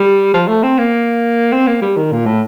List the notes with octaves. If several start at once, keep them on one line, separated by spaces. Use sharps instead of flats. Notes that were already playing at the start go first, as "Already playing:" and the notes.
Already playing: G3
F3
A3
C4
A#3
C4
A#3
G3
D#3
A#2
A2